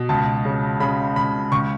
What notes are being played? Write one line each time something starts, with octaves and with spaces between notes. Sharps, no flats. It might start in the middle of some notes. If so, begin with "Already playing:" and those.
Already playing: B2
C#2 A5
C#3
C#3 B5
C#2 B5
C#2 C#6